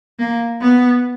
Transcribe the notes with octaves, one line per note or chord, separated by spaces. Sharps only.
A#3
B3